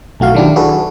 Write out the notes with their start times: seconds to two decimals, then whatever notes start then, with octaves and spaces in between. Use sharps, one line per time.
0.20 B1 A3 F#4 F5
0.35 D#3 F#3 D4 E4 G4
0.56 F#4 G#4 A4 B4